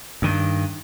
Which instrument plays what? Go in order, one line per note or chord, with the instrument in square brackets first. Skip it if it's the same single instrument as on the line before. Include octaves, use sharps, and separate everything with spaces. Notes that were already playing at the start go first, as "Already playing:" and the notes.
[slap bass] G2 D#3